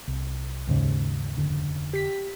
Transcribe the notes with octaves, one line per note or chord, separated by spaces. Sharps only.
C2
D#2 G#2 C#3
F1 D3
G4 B6